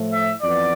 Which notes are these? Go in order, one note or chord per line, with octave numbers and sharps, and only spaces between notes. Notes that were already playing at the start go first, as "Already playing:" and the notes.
Already playing: A2 F3 A3
E5
F2 E3 B3 D5